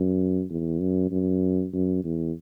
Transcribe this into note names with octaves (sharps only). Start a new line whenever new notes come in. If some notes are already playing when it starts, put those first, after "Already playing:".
Already playing: F#2
E2
F#2
F#2
F#2
E2